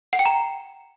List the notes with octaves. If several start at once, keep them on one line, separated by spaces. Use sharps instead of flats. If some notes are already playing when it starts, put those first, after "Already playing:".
F#5
G5
A#5